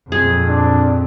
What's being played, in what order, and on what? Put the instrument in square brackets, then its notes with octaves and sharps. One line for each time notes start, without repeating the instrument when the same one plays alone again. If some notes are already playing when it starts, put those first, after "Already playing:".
[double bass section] F2 A#2 [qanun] G#4
[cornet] D4